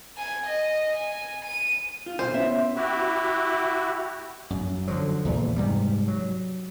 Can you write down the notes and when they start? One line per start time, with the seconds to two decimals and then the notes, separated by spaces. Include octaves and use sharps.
0.18 G#5
0.46 D#5
0.96 G#5
1.45 D#7
2.06 F4
2.19 D2 B2 C5
2.34 B3 C#4 E4 E5
2.74 E4 F#4 G4
4.50 F#2
4.88 D3 D#3 F3 F#3
5.25 E2 A#2 C#3 E3
5.56 G#2 C3 G3
6.08 F#3